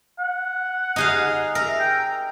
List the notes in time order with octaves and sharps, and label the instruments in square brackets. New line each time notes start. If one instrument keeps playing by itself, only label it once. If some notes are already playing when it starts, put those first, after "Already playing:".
[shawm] F#5
[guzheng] D#4 G#4 F5
[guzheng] A#4 [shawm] E5
[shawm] G5